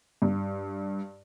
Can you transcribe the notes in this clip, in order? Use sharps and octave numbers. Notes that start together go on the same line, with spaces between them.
G2